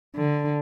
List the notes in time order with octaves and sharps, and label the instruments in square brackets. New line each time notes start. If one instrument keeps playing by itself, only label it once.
[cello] D3